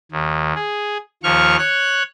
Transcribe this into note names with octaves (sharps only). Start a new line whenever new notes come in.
D#2
G#4
D#2 F3 C#6 F6
C#5 F#6